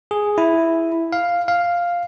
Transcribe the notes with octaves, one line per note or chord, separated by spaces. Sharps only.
G#4
E4
F5
F5